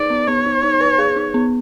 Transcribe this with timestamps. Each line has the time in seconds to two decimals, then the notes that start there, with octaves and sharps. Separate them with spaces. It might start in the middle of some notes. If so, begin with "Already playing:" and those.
Already playing: D#4 G#4 B4 D5
0.10 B3
0.27 B3 C#5
0.46 D#4
0.63 D#4
0.81 B4
0.99 G#4
1.16 D#4
1.34 B3